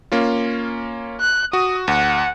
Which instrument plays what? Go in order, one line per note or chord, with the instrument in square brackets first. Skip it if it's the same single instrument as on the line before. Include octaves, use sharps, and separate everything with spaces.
[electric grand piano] A#3 C#4 F4
[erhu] F#6
[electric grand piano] F#4 [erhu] D#6
[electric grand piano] D2 [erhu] F#5